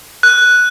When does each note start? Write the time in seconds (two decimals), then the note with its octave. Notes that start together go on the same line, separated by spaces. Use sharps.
0.23 F#6